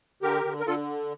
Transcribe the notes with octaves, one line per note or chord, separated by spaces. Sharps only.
D3 G4 A#4
D3
A#4
D3 F4 A4